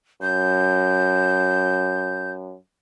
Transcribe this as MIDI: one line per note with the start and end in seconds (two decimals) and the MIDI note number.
0.22 2.56 42
0.22 2.31 91